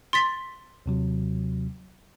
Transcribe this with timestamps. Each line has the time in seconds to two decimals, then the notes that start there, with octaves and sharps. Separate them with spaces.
0.13 C6 A6 B6
0.86 D#2 C3 F#3